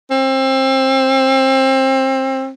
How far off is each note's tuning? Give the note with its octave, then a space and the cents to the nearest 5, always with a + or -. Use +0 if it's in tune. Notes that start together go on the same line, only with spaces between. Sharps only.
C4 +25